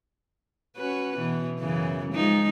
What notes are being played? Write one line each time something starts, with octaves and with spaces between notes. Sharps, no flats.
C#4 F#4 B4
B2 E3
F#2 C#3 E3
F3 G#3 D#4